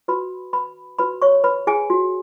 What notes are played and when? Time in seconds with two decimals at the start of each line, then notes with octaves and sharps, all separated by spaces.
0.08 F#4 B4 B5
0.53 B4 B5
0.98 F#4 B4 B5
1.22 C#5 C#6
1.44 B4 B5
1.67 G#4 G#5
1.90 F#4